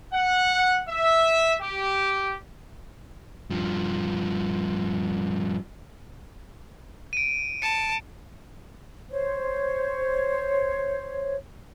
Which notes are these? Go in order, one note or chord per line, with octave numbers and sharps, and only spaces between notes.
F#5
E5
G4
G2 F3
D7 D#7
A5 C#7
C5 C#5